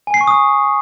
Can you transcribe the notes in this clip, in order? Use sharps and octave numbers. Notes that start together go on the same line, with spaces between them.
G#5
C7
C#6
D#6